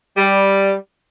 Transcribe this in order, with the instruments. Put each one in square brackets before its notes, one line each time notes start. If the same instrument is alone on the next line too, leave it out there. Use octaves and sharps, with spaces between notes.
[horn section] G3